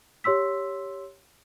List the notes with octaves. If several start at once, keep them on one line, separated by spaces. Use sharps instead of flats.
G4 C#5 C6 E6 B6